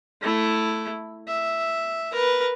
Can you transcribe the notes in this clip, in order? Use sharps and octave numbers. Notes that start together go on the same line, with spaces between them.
A3 E4
E5
A#4 B4